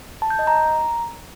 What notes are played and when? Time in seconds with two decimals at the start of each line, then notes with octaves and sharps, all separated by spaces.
0.22 A5
0.30 G6
0.39 D#5
0.47 A#5